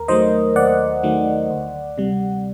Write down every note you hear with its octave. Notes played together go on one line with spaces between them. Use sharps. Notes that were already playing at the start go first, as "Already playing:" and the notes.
Already playing: D#2 A#4
D#3 F#3 A3 C5 D#5
D#2 D5 F#5
D#3 F#3 A3
D2
C3 G3